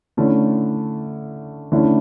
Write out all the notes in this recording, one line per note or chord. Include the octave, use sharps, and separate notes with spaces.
D3 A3 C#4 E4
D3 A3 C#4 E4